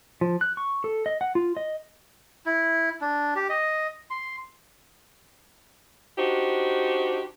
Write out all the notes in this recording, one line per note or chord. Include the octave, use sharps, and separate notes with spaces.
F3
F#6
C#6
A4
D#5
F#5
F4
D#5
E4
D4
G4
D#5
C6
D4 D#4 F#4 G4 C5